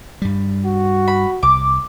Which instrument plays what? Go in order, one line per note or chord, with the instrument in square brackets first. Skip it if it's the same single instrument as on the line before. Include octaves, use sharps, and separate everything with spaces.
[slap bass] G2 G3
[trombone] F#4
[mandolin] B5
[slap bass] C2 [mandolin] D6